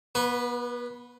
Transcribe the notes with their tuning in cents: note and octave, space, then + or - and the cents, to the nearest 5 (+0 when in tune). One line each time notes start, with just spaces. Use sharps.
B3 -35 B4 +0 C#6 -35